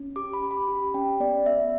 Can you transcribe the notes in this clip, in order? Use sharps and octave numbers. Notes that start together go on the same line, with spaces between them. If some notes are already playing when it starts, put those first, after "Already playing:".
Already playing: C#4
G4 D6
B5
G4
B5
G4
C#4 G5
B3 D5
B3 E5